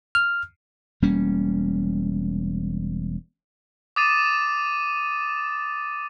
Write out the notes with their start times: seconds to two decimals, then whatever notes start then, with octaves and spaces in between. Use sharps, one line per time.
0.15 F6
1.02 E1 G3 A#3 C#4
3.96 D6 D#6 A6 D#7 E7